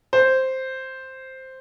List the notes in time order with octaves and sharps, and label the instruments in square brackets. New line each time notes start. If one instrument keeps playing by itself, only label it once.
[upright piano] C5